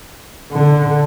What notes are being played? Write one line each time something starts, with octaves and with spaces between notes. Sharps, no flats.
D3